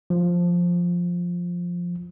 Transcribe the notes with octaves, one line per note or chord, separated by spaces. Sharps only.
F3